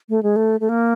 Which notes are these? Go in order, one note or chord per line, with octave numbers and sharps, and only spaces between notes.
A3
G#3
A3
A3
A#3